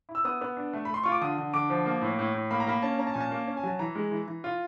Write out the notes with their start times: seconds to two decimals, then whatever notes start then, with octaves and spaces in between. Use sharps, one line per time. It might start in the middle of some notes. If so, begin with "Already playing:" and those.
0.09 E4
0.15 E6
0.25 B3 D#6
0.41 B3
0.57 D4
0.73 A3
0.85 B5
0.89 A3 C6
1.04 F4 C#6
1.12 D6
1.21 D3 D#6
1.38 D3
1.54 D3 D6
1.70 F3
1.86 A#3
2.02 A2
2.19 A2
2.34 A2
2.51 A#3 B5
2.60 A#5
2.67 A#3 B5
2.82 C#4 A5
2.99 C#4 A#5
3.07 A5
3.14 A#2 G#5
3.20 A5
3.31 A#3
3.47 C#4
3.57 G#5
3.63 F#3 A5
3.79 E3 A#5
3.95 G#3
4.11 E3
4.27 E3
4.44 F4